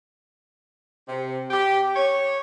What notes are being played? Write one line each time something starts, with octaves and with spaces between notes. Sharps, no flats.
C3
G4
C#5